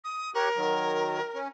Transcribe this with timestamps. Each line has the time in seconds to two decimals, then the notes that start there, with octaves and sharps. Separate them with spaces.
0.04 D#6
0.34 G4 A#4 C#5 F#6
0.57 D#3 F#3
1.35 C#4